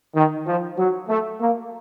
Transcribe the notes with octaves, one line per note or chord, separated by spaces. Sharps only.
D#3
F3
F#3
A3
A#3